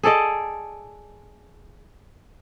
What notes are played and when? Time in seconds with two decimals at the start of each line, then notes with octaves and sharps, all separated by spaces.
0.03 G#4 A4 D5 D#5